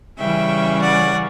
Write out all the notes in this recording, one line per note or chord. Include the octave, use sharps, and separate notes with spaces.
C#3 E3 G3 C#4 E5 G5
D5 F#5